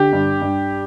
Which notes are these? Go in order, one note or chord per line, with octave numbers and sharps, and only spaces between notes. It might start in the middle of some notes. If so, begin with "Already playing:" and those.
Already playing: D3 G4
G2
G2